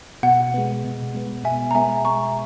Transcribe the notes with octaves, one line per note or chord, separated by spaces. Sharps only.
B2 F#5
G#3 B3
B2
G#3 B3
B2 E5 G#5
A#5
G#3 B3 E5 G#5
B2 A#5 C#6